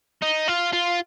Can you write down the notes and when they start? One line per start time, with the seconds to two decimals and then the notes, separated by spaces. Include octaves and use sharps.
0.22 D#4
0.48 F4
0.73 F4